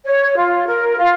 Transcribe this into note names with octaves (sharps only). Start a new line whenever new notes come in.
C#5
F4
A#4
F4